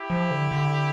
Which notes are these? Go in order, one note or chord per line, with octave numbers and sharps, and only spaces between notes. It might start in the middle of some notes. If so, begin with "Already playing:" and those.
Already playing: E4 G4
F3
D3
D3